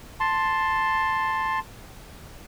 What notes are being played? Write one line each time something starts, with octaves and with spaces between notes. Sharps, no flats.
A5 C6